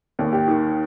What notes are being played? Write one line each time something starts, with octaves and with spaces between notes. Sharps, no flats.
D#2
G4
D#3